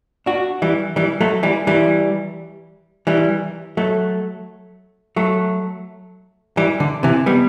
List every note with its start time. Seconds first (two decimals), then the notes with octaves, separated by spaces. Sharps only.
0.26 D4 F#4
0.62 E3 G3
0.96 E3 G3
1.21 F#3 A3
1.43 E3 G3
1.67 E3 G3
3.07 E3 G3
3.77 F#3 A3
5.16 F#3 A3
6.57 E3 G3
6.80 D3
7.03 C3 E3
7.26 G3 B3